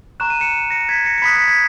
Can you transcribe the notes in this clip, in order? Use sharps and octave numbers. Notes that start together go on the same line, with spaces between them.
A#5 C#6 F#6 E7
D#7
C#7 E7
A#6 C#7
G#6 B6
A#6 C#7
C#7
B5 D#6 F#6 G#6 B6
G#6 B6
G#6 B6